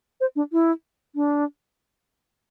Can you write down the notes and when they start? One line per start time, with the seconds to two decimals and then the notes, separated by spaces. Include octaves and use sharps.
0.20 C5
0.36 D4
0.52 E4
1.15 D4